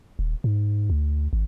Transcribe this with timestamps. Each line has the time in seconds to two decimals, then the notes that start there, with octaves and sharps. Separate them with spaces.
0.19 D#1
0.44 G#2
0.90 D2
1.33 G#1